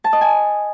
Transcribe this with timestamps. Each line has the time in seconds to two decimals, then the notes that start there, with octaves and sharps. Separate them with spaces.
0.04 A5
0.13 D#5
0.21 G#5